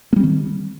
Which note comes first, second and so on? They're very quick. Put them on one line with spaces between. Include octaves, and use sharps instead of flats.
A#3 G3 C4 D#3